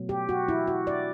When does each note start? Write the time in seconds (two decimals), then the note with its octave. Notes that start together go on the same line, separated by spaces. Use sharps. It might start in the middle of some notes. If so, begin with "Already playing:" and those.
Already playing: B2 F#3 A3
0.09 G4
0.29 F#4
0.48 E4
0.68 F#4
0.87 D5